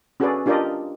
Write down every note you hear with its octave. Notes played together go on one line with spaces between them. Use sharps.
C#4 F#4 G#4 A4 B4 D5
D4 F4 G4 A#4 D5 D#5